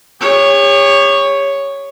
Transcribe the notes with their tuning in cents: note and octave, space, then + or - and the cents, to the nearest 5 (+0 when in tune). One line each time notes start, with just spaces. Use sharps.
G4 +45 C#5 +0